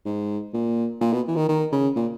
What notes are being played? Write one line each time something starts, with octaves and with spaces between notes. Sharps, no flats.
G#2
A#2
A#2
B2
E3
D#3
D#3
C#3
A#2